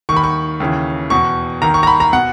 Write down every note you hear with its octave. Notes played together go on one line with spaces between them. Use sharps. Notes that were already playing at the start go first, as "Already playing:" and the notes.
D#2 D#3 B5 C#6
C#6
D#2 C#3 E3
E2 B2 C#6
D#2 D#3 A#5
C#6
A#5
B5
A#5
B2 F#5